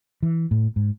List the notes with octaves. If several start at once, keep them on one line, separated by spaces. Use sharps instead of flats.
E3
A2
G#2